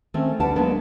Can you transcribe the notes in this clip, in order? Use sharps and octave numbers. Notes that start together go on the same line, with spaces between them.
D#3 A3 C4 C#4
D2 G3 D4 B4 F#5 A5
F#3 G#3 A#3 B3 D4